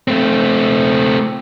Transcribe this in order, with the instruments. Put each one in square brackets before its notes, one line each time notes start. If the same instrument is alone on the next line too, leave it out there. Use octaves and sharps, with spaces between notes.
[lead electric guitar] A3 C4